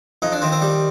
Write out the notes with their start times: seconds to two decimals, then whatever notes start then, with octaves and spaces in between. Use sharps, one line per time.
0.22 F2 D#4
0.32 D4
0.42 D#3 C4
0.52 C4
0.61 G3